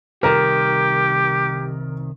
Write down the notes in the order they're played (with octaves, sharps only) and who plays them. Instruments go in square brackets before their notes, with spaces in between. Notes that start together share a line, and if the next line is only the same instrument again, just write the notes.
[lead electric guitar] C2 D#3 [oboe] G4 [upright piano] A#4